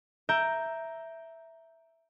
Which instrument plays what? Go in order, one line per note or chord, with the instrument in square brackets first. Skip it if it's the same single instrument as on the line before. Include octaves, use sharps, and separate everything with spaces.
[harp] E5 A#5 G6 D7